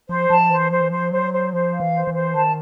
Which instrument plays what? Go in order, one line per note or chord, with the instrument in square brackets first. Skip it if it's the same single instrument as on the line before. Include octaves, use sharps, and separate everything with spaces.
[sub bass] F3 [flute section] C5
[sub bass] F3 [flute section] A5
[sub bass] E3 [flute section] C5
[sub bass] F3 [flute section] C5
[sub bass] E3
[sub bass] F3 [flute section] C5
[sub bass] F#3 [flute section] C5
[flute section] C5
[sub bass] F3 [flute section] C5
[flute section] F5
[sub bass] E3
[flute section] C5
[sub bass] E3
[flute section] C5
[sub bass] D#3 [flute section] A5